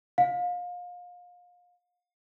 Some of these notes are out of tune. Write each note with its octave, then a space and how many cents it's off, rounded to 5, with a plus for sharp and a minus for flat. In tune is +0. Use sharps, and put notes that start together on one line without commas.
F5 +30